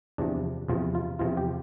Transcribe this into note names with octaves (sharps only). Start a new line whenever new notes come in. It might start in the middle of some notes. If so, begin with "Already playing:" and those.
E2 C3 F3 D4
E2 C3 F3 F4
F4
E2 C3 F3 F4
G4